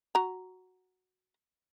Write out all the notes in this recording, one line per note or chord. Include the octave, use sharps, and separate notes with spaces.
F#4 A#5